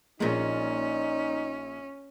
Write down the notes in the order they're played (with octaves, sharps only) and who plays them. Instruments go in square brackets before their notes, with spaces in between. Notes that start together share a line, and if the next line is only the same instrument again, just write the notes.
[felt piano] A#1 [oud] A#2 G#3 [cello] C#4 [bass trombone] D#4